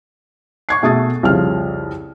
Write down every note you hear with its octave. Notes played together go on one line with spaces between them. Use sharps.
C#6 G#6 C7
B2 A3 G#4 D#6 A6
C2 F2 C#3 F3 F6